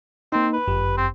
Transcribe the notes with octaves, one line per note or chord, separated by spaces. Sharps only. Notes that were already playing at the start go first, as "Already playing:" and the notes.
A#3 C4 D#4
B4
G1 F#2 G4
C4